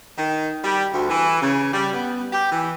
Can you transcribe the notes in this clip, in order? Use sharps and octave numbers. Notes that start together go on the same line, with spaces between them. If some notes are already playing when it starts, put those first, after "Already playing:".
D#3
G3
D2
E3
C#3
G3
B3
G4
E3